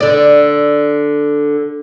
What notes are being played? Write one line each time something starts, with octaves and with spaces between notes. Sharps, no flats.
D3 D5